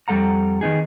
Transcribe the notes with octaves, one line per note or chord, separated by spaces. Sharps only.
F2 G3 A4 F#5 A#5
D#3 B3 D#4 G#4